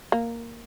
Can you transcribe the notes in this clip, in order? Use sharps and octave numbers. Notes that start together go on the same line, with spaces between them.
A#3